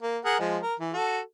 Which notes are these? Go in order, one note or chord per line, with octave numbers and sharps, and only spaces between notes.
A#3
G#4 A#4 F#5
F3 G#3
A#4
E3
F#4 A4